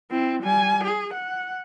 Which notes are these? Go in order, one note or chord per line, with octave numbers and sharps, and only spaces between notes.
C4 E4
G3 G#5
G#4
F#5